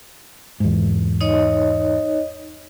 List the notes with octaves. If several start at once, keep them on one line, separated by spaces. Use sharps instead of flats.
E2 G#2
D#4 C#5 D#5